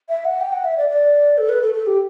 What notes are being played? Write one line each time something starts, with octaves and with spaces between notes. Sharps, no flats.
E5
F#5
G5
F#5
E5
D5
D5
A4
B4
A4
A4
G4